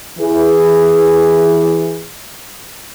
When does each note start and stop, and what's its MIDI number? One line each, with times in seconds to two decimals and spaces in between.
0.19 2.08 52
0.19 2.08 68